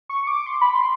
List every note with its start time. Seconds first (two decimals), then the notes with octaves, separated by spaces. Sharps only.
0.09 C#6
0.27 D6
0.46 C6
0.61 B5
0.74 C6